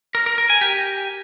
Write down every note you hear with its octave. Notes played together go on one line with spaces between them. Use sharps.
A#4
A#4
A#4
G#5
G4